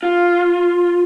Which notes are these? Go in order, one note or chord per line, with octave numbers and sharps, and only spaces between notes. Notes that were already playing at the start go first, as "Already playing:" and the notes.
F4